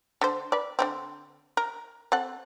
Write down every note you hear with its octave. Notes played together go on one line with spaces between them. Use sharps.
D3 C5
B4 D5
D3 D#3 C4
A#4
C4 A4 F#5